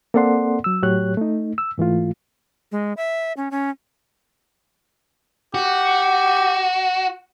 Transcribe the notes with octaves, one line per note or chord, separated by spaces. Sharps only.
A#3 C4 A4 D5 F#5 C6
F#3 E6
A2 F#3 G4 C#5 F#6
A3 D#4
E6
G#2 E3 A3 F4
G#3
E5
C#4
C#4
F#4 G4